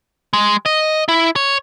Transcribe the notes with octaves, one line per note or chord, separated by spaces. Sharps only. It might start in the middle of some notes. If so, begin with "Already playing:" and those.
G#3
D#5
E4
C#5